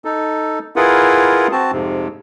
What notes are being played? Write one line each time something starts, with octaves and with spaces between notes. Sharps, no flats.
D#4 A4
E4 F4 G#4 A#4 B4 F#5
C4 F#4 A5
F2 G#2 C3